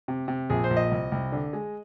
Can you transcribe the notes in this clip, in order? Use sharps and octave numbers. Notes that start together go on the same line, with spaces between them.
C3
C3
A#1 G#4
C5
A#1
D#5
C2
C2
D3
G#3